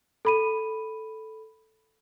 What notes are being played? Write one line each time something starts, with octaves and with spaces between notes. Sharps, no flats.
A4 B5 D#7